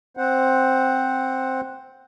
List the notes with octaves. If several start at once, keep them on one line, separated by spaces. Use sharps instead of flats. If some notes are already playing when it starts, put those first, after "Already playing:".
C4 C5 F#5